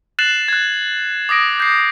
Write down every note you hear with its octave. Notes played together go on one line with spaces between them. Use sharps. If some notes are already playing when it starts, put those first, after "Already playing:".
F#6 A6 C7 E7 F#7
F#6 G#6
D6 D#6 A#6 D7
G6 C7